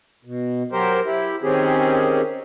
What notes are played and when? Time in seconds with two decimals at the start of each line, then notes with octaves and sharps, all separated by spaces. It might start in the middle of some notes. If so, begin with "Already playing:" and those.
0.25 B2
0.72 F#3 G4 A#4 C5
1.05 E4 G4
1.42 D#3 C4 C#4 G4 G#4